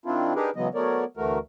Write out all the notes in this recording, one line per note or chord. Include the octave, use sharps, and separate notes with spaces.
D#3 C4 D4 E4 F4
D4 D#4 G4 G#4 A#4 B4
C#3 E3 F#3 G#3 B3 D#5
F#3 A3 B3 A#4 C#5 D5
D2 E3 A3 F#4 A#4